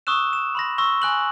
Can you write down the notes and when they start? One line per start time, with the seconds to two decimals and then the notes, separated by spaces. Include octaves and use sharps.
0.07 C#6 D#6 E6 F#6 E7
0.33 E7
0.55 B5 C6 A#6
0.78 C6 C#6 E6 A#6
1.02 G#5 F#6 F#7